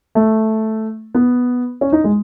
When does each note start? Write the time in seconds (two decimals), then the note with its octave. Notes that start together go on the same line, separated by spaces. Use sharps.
0.15 A3
1.15 B3
1.81 C#4
1.92 D#4
2.04 G#3